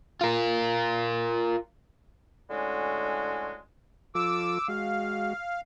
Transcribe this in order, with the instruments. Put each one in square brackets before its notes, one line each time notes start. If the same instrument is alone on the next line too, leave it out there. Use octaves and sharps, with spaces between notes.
[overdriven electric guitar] F4 A#4
[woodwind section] A2 D3 G#3 C#4 F#4
[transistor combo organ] F3 F4 A4 [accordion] D6 E6
[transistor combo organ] G#3 F#4 [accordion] F5